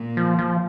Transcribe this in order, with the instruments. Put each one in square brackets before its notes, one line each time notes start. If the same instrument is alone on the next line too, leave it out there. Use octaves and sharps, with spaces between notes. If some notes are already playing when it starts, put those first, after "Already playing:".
Already playing: [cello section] A#2
[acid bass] F3
F3